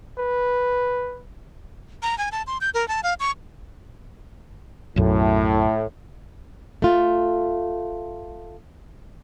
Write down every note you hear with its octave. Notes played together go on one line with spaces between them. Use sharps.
B4
A#5
G#5
A5
C6
G6
A#4
A5
F5
C#6
B1 F#2 A2
A3 F4